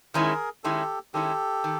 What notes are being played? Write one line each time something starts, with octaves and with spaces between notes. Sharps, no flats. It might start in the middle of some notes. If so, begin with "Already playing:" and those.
D#3 G#3 C#4 E4 G#4 A#4
D#3 G#3 C#4 E4 G4 A4
D#3 G#3 C#4 E4 G4 A4
D#3